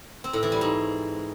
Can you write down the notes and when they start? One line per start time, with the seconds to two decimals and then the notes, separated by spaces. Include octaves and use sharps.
0.24 C4
0.33 A2
0.43 E3
0.52 G3
0.61 G#2